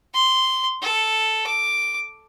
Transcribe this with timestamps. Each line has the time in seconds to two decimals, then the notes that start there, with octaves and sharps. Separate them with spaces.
0.14 C6
0.82 A4
1.46 D6